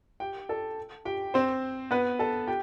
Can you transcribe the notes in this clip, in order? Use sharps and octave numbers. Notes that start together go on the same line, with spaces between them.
G4 G5
A4 A5
G4 G5
C4 C5
B3 B4
A4 A5
G4 G5